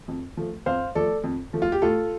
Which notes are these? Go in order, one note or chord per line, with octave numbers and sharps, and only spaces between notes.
F2
F3 A3
F2 C5 F5
F3 A3 A4 D5
F2
F3 A3
F4
G4
A2 F4 A4